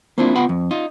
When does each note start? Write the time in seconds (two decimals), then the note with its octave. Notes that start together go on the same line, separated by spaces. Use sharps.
0.18 A#3 C4 D4 E4 F4
0.35 B3 F4 F#5 G5 B5
0.49 F2
0.71 D#4 F4